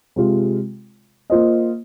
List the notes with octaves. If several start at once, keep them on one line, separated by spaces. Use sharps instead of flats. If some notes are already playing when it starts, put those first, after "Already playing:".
C3 G#3 F4
A#3 F4 C5 D#5